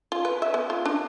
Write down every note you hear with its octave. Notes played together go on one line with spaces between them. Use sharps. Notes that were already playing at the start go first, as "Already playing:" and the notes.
F4
B4
E5
B3
F4
D4